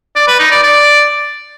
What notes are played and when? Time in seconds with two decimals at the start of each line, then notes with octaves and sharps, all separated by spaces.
0.16 D5
0.28 B4
0.39 D#4
0.51 D5
0.63 D5